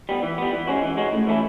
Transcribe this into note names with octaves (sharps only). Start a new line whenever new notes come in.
G3 B3
E3
G3 B3
E3
G#3 C#4 F#4
E3
G#3 C#4 F#4
A2
E3 A3 C#4 E4